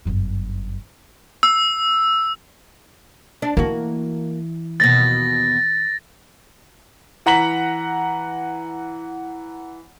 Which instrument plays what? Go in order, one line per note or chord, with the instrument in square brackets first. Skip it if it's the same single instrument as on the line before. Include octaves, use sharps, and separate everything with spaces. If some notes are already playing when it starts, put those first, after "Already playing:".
[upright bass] G1 F#2
[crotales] E6
[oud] D4
[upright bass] E3 [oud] A#3 F#4
[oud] D#2 B2 [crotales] A6 A#6
[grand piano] E3 F#5 A#5 B6 F#7